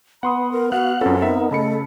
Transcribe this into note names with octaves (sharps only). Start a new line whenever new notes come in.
B3 F#5 B5 C6 D#6
A#4
B3 F#4 F5 F#5 F#6
F#2 C4 C#4 F4 A4 B4
B3 D#4 A#4 E5
C#3 A3 A4 D#5 B5 C#7